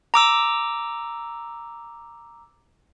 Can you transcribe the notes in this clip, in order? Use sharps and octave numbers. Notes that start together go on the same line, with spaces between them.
A#5 D6 E6